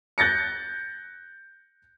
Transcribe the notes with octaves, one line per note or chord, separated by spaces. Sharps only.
F#6 G6 A6 A#6 C#7